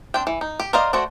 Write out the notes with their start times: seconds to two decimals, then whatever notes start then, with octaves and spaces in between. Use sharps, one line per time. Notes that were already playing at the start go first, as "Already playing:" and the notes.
0.14 C4 D4 G5
0.27 E3
0.41 D#4
0.60 G4
0.73 A#4 C5 D5 D#5 F5
0.93 A3 F#4 C5 D5